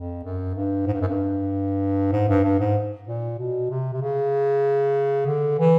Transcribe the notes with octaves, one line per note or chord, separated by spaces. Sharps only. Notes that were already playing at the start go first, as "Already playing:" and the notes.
Already playing: F2
F#2
G2
G#2
G2
F#2
G2
G#2
G2
G2
G#2
A#2
B2
C3
C3
C#3
D3
E3